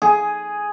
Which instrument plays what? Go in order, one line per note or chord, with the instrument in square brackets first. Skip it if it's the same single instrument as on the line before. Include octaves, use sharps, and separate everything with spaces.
[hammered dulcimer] G#4